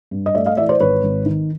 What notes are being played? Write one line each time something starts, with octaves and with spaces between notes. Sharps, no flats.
G2
D#5
A3 D5 E5
D#5 F5
E3 D5 E5
C5 D5
G#1 B4 C#5
G#1
D#3